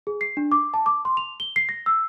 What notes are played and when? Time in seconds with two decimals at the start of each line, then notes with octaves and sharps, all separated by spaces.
0.07 G#4
0.21 C7
0.37 D4
0.52 D6
0.74 A5
0.86 D6
1.05 C6
1.17 F7
1.40 G7
1.56 C7
1.69 A#6
1.86 E6